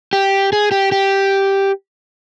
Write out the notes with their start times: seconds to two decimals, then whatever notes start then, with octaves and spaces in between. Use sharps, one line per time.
0.13 G4
0.53 G#4
0.71 G4
0.92 G4